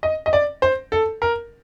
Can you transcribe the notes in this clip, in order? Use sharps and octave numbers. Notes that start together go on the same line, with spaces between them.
D#5
D#5
D5
C5
A4
A#4